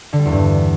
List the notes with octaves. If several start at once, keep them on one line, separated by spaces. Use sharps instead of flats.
D3
G3
E2
G2